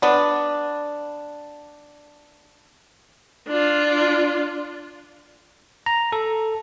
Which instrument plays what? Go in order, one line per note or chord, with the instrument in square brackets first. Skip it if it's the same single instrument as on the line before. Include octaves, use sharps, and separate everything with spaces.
[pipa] B3 D4
[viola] D4 F4
[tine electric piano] A#5
A4